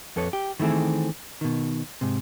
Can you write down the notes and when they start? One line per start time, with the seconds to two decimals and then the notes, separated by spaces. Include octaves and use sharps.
0.16 F2 A4 B4 C#5
0.33 G4
0.60 D#3 E3 A3 C4 G#4
1.41 B2 D#3
2.01 G#2 C3